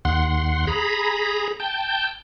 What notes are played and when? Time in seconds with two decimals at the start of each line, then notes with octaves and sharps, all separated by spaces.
0.05 D#2 F#5 C6
0.67 G#4 A#5 B5
1.60 G5 A5 G6